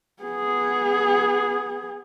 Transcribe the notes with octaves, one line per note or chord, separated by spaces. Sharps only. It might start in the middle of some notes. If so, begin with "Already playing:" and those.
B3 G#4